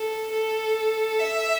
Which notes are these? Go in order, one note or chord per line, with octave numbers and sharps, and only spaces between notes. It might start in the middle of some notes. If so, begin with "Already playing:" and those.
Already playing: A4
A4
E5